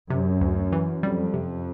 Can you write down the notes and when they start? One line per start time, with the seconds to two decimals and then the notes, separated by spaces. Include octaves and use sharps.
0.10 F#2 C3
0.41 D2
0.72 E3
1.03 F2 G3
1.34 C3